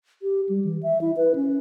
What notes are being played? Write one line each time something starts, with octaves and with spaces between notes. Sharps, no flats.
G4
G3
E3
E5
E4
B4
C#4